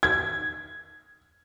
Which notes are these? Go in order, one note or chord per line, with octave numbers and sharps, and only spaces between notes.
G#6